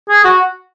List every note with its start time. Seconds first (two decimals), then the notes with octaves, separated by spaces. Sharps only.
0.09 G#4
0.24 F#4